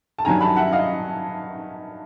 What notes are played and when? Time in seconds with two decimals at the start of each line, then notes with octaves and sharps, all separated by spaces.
0.18 A5
0.25 G2 D#3 F#3 G#5 A#5
0.41 A5 B5
0.56 E5 F#5
0.73 D#5 F5